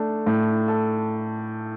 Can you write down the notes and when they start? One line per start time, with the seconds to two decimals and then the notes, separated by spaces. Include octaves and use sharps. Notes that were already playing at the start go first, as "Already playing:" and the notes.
Already playing: A3 D4
0.26 A2
0.68 A4